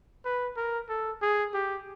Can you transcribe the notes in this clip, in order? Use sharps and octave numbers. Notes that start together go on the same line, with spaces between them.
B4
A#4
A4
G#4
G4